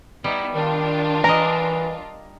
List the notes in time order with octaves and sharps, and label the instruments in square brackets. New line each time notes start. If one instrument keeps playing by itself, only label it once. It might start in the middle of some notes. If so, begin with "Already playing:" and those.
[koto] G3 [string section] B3 D#4 E4
[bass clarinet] D#3 [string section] D4 F4
[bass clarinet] E3 [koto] A#4 D#5 [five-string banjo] A#5